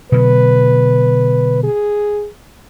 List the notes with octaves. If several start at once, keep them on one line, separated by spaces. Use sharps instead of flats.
B2 D3 F#3 B4
G#4